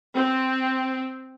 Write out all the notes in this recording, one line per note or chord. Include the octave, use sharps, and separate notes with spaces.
C4